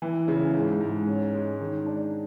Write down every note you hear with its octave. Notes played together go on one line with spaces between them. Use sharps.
E3
C#3
G#2
G#2
C#4
G#3
D#3
D4